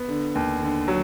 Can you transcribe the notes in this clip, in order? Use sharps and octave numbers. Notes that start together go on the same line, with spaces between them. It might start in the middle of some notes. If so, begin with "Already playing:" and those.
Already playing: B3
D3
D#2
D3
F#3